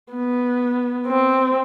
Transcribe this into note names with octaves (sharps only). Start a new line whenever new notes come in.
B3
C4